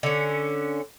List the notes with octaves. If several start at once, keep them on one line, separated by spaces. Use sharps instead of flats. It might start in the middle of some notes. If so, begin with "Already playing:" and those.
D3 C#4